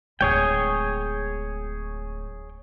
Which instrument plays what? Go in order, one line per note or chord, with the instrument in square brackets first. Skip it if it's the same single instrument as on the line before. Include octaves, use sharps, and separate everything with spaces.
[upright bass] D1 G#3 [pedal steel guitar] G#4 C#5 G5